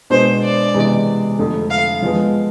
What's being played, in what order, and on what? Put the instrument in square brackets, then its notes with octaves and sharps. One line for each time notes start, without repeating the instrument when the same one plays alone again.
[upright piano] B2 G#3 B3 D4 [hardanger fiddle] C5
[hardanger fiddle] D5
[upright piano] C3 E3 G#3 B3
F2 D3 A3
[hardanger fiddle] F5
[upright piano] F3 G#3 B3